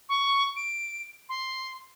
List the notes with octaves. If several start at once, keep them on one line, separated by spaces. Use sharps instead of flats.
C#6
D7
C6